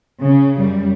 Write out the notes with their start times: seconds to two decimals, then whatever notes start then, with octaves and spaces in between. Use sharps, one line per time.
0.20 C#3
0.59 F#2 G3